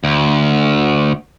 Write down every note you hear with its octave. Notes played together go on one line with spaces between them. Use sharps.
D2